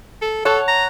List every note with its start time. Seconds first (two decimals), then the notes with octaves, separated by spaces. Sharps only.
0.22 A4
0.45 A4 C#5 F#5 A5
0.68 A#5